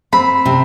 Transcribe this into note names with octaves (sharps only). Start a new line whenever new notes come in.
C4 B5
C3